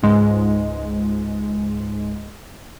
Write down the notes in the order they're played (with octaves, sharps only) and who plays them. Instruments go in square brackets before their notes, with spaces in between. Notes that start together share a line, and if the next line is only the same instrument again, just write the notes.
[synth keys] C#2 G#2 G#3